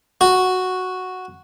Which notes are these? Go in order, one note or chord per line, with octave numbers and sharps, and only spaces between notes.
F#4